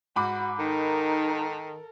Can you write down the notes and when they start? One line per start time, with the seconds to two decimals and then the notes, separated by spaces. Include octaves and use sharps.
0.16 G#2 F#4 B5 D6
0.59 D#3 D#4 A4 A#4